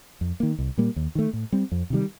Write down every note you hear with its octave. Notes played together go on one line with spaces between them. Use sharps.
F2
D#3 A#3
C2
A#2 G3 A#3
D#2
D#3 A3
A2
G3 C4
F2
C3 D#3 G3